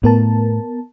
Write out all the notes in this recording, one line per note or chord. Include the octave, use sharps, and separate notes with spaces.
A2 B3 A#4 A5